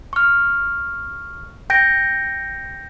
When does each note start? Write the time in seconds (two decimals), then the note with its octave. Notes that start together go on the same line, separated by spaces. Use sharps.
0.13 C#6 F6
1.70 G5 G6 A#6 D7